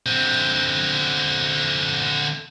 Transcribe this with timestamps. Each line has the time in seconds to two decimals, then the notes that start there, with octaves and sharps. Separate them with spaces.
0.06 D3 C4